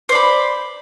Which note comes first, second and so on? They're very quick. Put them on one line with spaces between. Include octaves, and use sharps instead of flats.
C5 D5 B5